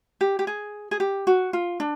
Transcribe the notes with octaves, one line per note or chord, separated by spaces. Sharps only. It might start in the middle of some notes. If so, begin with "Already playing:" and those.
G4
G4
G#4
G#4
G4
F#4
F4
D4